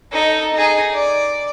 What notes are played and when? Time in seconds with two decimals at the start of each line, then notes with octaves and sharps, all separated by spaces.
0.12 D#4 A4
0.54 D#4 G#4
0.94 D5